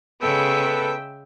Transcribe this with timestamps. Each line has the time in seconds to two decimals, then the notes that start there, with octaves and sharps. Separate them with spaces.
0.21 C#3 G#3 B3 A4 E5 G5